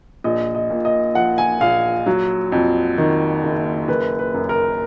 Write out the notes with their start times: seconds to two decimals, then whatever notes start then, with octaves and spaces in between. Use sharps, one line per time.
0.24 A#1 D#5
0.55 D#5
0.70 A#2
0.85 D#5
1.15 F3 F#5
1.38 G#5
1.61 A#1 F5
2.06 F#3
2.52 F2
2.98 D#3
3.43 F#1
3.88 F#1 B4
4.19 B4
4.34 F#2
4.49 A#4